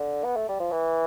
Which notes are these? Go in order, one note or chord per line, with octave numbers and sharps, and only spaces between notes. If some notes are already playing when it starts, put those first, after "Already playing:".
Already playing: D3
B3
A3
G3
F3
E3